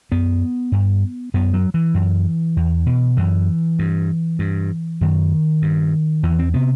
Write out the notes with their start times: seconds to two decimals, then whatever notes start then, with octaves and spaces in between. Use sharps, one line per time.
0.12 F#2 B3
0.72 G2
1.34 F#2 B3
1.54 F#3
1.74 E3
1.94 F#2
2.57 E2
2.86 B2
3.17 F#2 E3
3.79 G2
4.39 G2
5.01 F#2 D#3
5.62 G2
6.23 E2 E3
6.39 C4
6.54 C3 B3